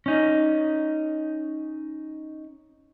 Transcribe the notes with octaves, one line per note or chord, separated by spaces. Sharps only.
C#4 D#4